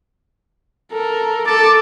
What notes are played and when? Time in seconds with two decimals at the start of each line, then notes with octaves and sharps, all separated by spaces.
0.92 A4 A#4
1.47 A4 A5 D6